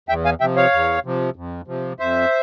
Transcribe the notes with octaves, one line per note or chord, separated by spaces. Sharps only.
E2 E5 G5
F5 G#5
C3 F3 E5 G5
C#5 F5
E2
C3 F3
F2
C3 F3
F2 C5 E5